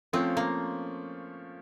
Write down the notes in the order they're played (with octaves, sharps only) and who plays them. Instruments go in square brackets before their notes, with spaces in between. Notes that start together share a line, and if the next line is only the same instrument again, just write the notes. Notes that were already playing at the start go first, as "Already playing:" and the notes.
[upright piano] F3 A3 C#4 F4 [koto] C4
[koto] A#3